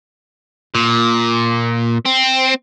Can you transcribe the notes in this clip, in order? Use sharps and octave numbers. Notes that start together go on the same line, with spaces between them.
A#2
C4